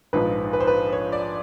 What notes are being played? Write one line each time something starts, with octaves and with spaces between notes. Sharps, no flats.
A#1 G#2 F3 G#3 B4
B4
C5
B4
C#5
D5